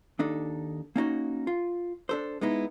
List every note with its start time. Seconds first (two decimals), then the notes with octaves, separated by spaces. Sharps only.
0.19 D#2 D4 D#4 A4
0.96 A#3 C#4 D#4 F#4
1.47 F4
2.09 D4 A4 C5
2.41 G#3 B3 D#4 E4